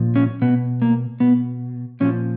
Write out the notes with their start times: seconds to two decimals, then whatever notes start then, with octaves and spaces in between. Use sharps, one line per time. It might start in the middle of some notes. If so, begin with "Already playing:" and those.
Already playing: A#2 F3
0.16 C#4
0.42 B2 B3
0.82 A#3
1.20 B2 B3
2.00 A#2 F3 C#4